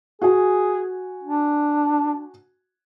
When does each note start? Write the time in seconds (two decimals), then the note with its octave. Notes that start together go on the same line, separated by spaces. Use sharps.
0.22 F#4 G#4 G#5
1.24 D4